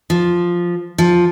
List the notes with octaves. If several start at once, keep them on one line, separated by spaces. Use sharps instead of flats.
F3
F3